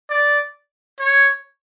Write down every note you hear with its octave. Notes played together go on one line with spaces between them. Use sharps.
D5
C#5